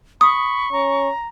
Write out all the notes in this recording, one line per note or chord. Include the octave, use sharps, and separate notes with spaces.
B5 C#6 D#6
C#4 A#5